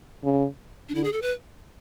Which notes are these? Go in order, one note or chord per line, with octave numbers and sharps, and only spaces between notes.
C#3
D4
D3 E4
G#4
A4
B4